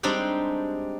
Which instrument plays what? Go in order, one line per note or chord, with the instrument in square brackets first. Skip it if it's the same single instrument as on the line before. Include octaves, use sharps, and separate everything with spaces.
[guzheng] G3 G#3 C4 D4 D#4 G4